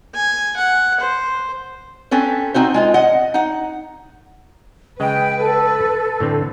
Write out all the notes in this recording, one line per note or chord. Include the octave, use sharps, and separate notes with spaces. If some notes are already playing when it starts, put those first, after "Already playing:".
G#5
F#5
C5
C4 C#4 A4 B4
C4 D#4 F#4 C5
G#3 F4 D#5
D#5 F#5
D#4 F#5
C#3 G#3 B4 D#5 G5
A4
A2 D3 C4